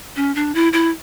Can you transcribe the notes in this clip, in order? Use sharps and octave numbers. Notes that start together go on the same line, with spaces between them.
C#4
D4
E4
E4